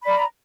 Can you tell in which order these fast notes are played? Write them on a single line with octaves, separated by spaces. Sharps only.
B5 D5 A#5